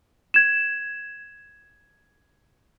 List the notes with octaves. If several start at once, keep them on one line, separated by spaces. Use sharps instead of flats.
G#6 E7